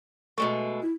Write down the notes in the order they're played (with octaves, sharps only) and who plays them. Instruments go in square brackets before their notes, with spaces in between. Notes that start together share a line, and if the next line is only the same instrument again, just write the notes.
[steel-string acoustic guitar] B2 G#3 A3 [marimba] C#6
[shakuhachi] E4